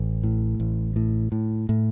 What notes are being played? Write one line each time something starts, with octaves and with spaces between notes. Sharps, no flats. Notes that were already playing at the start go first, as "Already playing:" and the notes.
Already playing: A1
A2
A1
A2
A2
A2